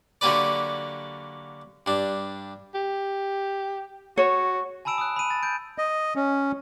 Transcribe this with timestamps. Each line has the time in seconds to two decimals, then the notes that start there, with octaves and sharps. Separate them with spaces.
0.21 D3 F#3 A#3 G4 B4 D5
1.86 G2 D4
2.75 G4
4.17 F#4 C#5
4.85 G#5 A5 B5 E6 D7 E7
4.98 D#6 E6 F#6
5.16 B5 D#7
5.30 A6
5.43 G6 D7
5.78 D#5
6.16 C#4